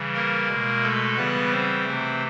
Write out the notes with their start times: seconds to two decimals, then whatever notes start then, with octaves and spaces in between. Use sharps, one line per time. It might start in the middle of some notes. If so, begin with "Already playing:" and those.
Already playing: C#3 E3 G3
0.14 A#3 A#4
0.49 B2 G#3
0.83 A3 A4
1.17 C#3 E3 G3 B3 B4
1.51 C4 C5
1.85 C3 E3 A3